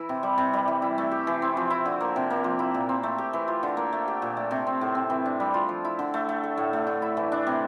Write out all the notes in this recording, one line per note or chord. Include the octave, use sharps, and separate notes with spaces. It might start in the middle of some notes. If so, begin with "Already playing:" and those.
Already playing: E3 E4
C3
G3
C3
G3
E3
E4
A3
G4
E3
C4
F3
E4
D3
A#3
C3
A#3
F3
E4
A#2
C4
A3
G4
E3
F4
D3
A#3
A3
G4
A#2
A3
C3
C4
A2
C4
E3
D4
G3
F4
F3
E4
D3
A3
A3
A4
A2
A3
D3
E4
E3
D4
C3